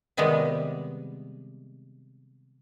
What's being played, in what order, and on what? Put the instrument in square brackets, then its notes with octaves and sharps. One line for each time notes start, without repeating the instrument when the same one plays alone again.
[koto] C3 D#3 G3 G#3 B3